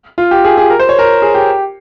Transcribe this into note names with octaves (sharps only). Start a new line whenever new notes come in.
F4
G4
G#4
G#4
A#4
C5
C#5
A#4
G#4
G4